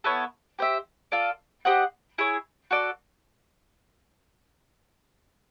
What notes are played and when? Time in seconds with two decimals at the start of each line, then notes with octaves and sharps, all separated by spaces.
0.04 B3 E4 A4 C#5
0.59 G4 C5 E5
1.12 F4 A4 D5
1.65 G4 C5 D#5 F#5
2.18 E4 G#4 C#5
2.71 F#4 A4 D5